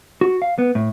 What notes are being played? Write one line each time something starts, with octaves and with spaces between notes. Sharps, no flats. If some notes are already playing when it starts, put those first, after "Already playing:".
F#4
F5
B3
A2